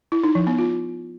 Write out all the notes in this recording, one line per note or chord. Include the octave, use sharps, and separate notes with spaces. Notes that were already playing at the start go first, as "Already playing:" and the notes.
E4
D#4
F3
B3
F4